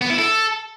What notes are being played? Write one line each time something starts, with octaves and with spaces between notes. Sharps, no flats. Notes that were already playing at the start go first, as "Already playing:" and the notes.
B3
E4
A4